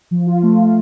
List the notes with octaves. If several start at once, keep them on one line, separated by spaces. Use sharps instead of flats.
F3
F4
A3
A3